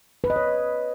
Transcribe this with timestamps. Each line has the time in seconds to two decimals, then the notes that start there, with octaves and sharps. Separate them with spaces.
0.24 B4
0.30 D#5
0.36 C#5